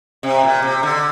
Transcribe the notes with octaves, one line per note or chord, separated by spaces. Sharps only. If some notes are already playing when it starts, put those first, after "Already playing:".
C3
A#2
C3
D3